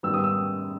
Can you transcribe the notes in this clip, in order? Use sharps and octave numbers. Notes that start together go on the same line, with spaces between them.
G#2 D#3 G3 B3 E6
D#6
E6